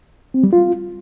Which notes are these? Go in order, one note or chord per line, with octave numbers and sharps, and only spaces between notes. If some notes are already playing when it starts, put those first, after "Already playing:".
C4
G3
F4